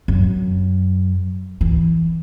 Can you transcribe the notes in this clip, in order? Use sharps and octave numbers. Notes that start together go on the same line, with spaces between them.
F#2
E3